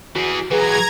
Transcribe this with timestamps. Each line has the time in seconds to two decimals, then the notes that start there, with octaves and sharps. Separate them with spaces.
0.16 E3 F#4 G#4 C7 D7
0.51 E3 F#3 G#4 B4 A#5 G#6